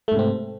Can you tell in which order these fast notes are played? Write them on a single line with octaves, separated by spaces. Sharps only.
A3 G#2 C3 C4